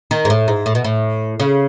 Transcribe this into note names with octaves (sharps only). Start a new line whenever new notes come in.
D#3
G#2
A2
G#2
A2
B2
A2
C#3